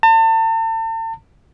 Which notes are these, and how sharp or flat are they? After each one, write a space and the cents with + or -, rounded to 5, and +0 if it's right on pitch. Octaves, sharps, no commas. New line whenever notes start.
A5 +40